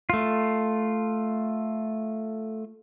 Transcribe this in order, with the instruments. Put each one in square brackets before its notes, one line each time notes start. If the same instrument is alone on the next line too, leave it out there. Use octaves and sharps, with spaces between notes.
[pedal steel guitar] A3 F4